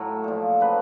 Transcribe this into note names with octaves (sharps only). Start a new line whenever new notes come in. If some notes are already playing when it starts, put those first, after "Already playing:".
Already playing: A2 F#3 A4
A#2 F3
C#3 F#3 B4